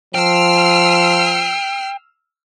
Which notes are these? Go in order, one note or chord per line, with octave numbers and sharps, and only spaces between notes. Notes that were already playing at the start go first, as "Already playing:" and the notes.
F3 G5 E6 F6 C7